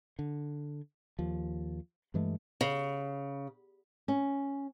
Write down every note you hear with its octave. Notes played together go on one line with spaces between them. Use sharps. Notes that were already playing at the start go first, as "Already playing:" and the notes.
D3
D#2 F3
G2 E3 G#3 A3
C#3
C#4